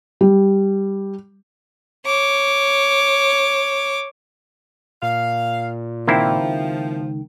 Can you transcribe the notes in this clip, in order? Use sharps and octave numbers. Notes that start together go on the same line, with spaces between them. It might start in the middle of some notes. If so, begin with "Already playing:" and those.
G3
C#5 D6
A#2 F5
C#2 D#3 F3 A#3 C4 E4 G5